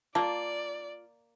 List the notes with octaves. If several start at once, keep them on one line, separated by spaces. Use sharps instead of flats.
A#3 F4 D5 A5